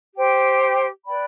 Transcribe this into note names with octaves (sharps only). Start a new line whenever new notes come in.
G4 C5 G5
B4 D5 G5 B5